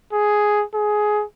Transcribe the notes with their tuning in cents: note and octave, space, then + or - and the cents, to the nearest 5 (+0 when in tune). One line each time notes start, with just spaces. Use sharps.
G#4 +5
G#4 +15